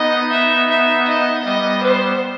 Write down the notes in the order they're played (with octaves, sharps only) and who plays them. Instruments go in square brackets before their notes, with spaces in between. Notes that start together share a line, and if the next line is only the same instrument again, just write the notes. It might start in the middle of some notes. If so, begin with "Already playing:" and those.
Already playing: [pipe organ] B3 D#4 [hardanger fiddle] D#5
[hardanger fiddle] E5
E5
D#5
[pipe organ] G3 B3 [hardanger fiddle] D#5
[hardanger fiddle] C5